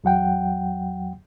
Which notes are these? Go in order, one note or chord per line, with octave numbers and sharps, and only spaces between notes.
E2 F#3 F#5 G5